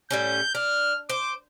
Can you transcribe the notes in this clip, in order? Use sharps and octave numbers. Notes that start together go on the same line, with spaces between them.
A2 G3 C#4 G6
D4 F6
C5 D6